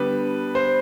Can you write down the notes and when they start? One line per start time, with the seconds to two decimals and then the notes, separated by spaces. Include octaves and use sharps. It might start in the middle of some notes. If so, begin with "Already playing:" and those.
Already playing: D3 G3 B3 B4
0.55 C5